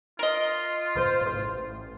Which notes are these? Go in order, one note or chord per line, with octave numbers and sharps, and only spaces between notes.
F4 A#4 D#5
C5
A1